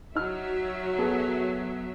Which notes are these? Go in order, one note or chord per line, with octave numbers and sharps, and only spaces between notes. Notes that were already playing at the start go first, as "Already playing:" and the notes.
F#3 D#4 E5 F6
B3 G#4 A4